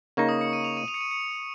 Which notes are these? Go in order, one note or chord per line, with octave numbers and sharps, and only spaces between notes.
C#3 A#3 D#4 C#6
D#6
C#7
D#7
F7
D#7
F7
C#7
D#7
C#7